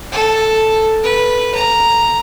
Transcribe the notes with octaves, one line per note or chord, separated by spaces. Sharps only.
A4
B4
A#5